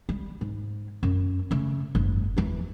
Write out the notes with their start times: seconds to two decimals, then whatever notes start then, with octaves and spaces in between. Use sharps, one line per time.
0.09 G3
0.41 G#2
1.03 F#2
1.51 C#3 A3
1.95 F#1 G#2
2.37 E2 E3